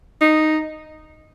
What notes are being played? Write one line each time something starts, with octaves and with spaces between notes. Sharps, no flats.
D#4